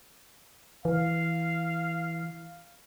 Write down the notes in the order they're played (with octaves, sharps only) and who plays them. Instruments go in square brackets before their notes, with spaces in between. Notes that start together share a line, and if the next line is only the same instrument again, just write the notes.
[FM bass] E3 [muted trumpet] F5